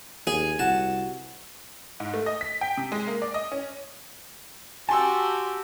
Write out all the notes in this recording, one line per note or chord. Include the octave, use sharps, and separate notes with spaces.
D#2 G#4 G#5
C2 F#4 A5
G#2
A3
D#5
B6
G5
C3
G#3
A#3
D5
D#5
C#4
F#4 G4 G#5 A5 C6 E6